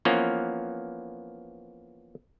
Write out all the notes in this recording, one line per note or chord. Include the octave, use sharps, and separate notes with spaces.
E3 F3 A#3 B3 C#4